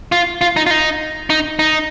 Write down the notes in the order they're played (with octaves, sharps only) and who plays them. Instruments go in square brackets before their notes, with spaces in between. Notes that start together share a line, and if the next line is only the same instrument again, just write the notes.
[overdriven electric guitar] F4
F4
D#4
F4
D#4
D#4
D#4